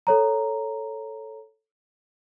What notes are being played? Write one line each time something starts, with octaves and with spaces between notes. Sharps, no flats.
A4 C#5 A#5